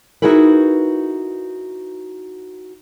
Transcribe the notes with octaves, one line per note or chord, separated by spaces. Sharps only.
D#4 E4 F#4 G#4 A#4 B4